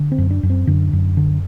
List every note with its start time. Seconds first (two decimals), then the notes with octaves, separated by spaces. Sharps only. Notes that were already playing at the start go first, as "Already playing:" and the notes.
Already playing: D3
0.12 C4
0.18 F#2
0.31 D4
0.43 F#2
0.50 C4
0.67 F#2 D3
0.93 F#2
1.17 D3